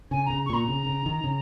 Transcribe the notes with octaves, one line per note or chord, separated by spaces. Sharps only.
C#3 G#5
A#5
C#3
C#6
A#2 A#5
C#3
C#3
D#3
C#3